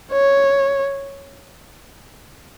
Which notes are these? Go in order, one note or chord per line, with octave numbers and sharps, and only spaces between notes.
C#5